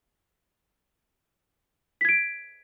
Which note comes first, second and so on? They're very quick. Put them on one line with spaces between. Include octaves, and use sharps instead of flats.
B6 G#6 D7